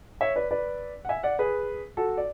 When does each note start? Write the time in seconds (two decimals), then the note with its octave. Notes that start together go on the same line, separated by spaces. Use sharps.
0.21 C#5 E5
0.36 B4 D5
0.51 B4 D5
1.05 F#5
1.09 E5 G#5
1.23 D5 F#5
1.39 G#4 B4
1.97 F#4 A4
2.17 D5